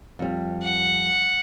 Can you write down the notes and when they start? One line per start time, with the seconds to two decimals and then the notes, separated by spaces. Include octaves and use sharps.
0.19 F2 G3
0.62 F#5